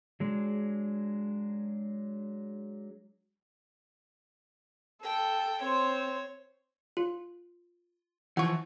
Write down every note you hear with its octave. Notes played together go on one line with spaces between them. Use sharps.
F#3 G#3 D4
A4 G5
C4 C5 C#5
F4
E3 F3 F#5 C#6